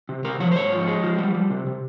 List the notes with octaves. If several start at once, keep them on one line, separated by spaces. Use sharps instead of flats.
C3
C3 A#4
F3 C#5
C5
G#2 C#5
F3
G#3
F3
G3
G3
C3
C3